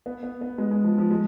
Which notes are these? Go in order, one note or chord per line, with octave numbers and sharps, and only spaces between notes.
B3
B3
B3
G#3
G#3
F3
F3
G#3